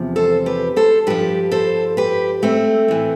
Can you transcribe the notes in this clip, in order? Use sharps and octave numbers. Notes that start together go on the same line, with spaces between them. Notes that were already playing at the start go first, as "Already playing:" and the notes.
Already playing: E2 C3 F3
A4 C5
G4 B4
A4 C5
G2 F3 G4 B4
A4 C5
G4 B4
A3 C4
A2 E3